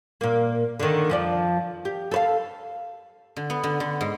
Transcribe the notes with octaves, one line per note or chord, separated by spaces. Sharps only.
A#2 A#3
D3 D#3
F2 F3 D5
G4
A4 B4 F5
D3
B3
D3
D3
G#2